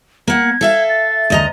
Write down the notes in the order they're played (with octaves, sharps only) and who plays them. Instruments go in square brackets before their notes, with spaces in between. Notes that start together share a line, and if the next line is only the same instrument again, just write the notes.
[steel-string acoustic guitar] A#3 F#5 [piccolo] G#6
[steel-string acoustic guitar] A4 E5 F5
[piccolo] A6
[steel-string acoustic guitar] D2 D#5 A#5